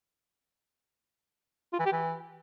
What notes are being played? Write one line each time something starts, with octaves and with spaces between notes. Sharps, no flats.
F4
E3
G4
E3